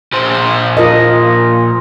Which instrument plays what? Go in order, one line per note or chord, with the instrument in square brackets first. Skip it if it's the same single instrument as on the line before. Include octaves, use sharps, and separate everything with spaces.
[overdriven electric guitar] A#2 C5
[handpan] F4 A#4 D#5